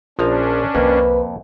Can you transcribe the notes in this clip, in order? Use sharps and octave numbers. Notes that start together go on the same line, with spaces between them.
A#1 F3 C#4 D4 A#5
C2 F2 A#3 B4